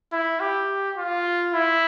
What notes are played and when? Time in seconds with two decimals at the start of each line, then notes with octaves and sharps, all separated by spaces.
0.12 E4
0.40 G4
0.97 F4
1.53 E4